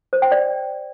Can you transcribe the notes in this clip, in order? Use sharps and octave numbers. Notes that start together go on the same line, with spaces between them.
C5
G5
D5